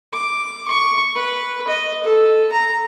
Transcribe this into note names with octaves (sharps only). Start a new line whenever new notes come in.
D6
C#6
B4
D#5
A4
A#5